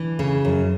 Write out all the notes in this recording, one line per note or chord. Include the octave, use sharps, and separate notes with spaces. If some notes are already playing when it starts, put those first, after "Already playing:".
Already playing: E3 D4
C#3
F#2